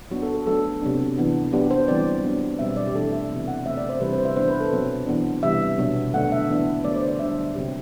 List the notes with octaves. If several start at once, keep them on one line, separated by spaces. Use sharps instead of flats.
F#3 B3 D4 F#4
A4
A4
F#3 A3 D4 A4
C3 F#3 B3 D4
E3 B3 D4
F#3 B3 D4 G4
C5
E3 G3 C4 D5
F#3 B3 D4
B2 G3 C4 E5
D5
G4
E3 A3 D4 A4
E5
C3 E3 B3
F#5
C3 F#3 A3 C4 E5
D5
C5
C3 E3 G3 D4 B4
C5
E5
E3 B3 D4 C5
B4
A4
B2 F#3 C4
E3 B3 D4
C3 E3 G3 E5
B2 F#3 B3 D4
D3 A3 D4 F#5
E5
E3 B3 D4
D3 F#3 A3 D5
C5
D5
D3 G3 D4 E5
C3 F#3 A3 C4